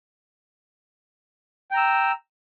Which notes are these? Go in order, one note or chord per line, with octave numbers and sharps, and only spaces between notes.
G5 A#5 E6